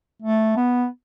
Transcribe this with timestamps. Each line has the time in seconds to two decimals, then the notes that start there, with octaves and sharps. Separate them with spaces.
0.22 A3
0.56 B3